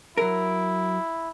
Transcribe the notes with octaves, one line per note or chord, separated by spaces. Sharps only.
F#3 E4 A#4